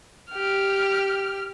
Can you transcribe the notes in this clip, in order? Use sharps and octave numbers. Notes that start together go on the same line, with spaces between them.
G4 F6